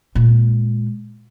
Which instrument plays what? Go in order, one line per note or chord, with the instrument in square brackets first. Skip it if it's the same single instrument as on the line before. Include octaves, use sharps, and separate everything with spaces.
[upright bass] A#2 G#3